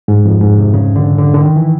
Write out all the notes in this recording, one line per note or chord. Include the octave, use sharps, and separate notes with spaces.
G#2
F2
G#2
C3
C#3
D3
D3
D3
D#3
E3